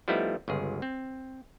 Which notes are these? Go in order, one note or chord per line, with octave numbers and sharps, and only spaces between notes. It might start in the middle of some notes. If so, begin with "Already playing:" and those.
F3 G3 A3 B3 D#4 E4
G1 C#2 G#4
C4